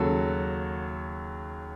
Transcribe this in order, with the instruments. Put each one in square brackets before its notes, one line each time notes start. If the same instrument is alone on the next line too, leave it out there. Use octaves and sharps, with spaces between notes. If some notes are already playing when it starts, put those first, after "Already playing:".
Already playing: [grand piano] D#2 C#3 F#3 F#4 A4